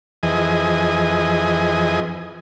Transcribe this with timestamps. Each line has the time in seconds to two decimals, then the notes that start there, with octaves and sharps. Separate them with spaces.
0.23 F2 E3 G#4 D#5